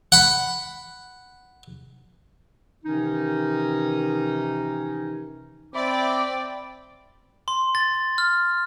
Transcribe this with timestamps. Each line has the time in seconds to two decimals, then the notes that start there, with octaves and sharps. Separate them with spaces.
0.12 F#5 B5
2.84 C3 D#3 E3 C#4 D#4
5.74 C4 D5 E5 G5 B5 D6
7.48 C6
7.75 A6
8.18 F6